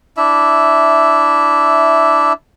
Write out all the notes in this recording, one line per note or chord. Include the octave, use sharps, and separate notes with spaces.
D4 E4 E5